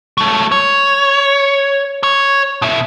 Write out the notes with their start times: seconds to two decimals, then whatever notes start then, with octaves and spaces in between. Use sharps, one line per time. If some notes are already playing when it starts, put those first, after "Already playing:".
0.18 F#3 A3
0.52 C#5
2.03 C#5
2.62 B2 E5